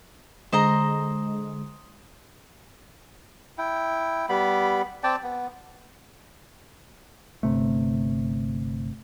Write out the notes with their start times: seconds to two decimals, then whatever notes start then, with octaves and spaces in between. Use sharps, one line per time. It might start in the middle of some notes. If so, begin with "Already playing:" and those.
0.53 D3 G#3 C5 D#5 A#5
3.58 E4 G5
4.29 G3 B3 B5
5.04 C4 D5 G5 A5
5.23 B3
7.43 G1 C3 A3